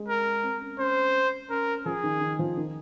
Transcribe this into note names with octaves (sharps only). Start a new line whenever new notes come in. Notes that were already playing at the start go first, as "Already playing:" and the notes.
Already playing: G#3
A#4
C4
C#4
C#4 C5
C#4 A#4
F3 G#4
D#3
D#3
F3
D#3